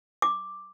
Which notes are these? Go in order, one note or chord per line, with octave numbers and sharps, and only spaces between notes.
D6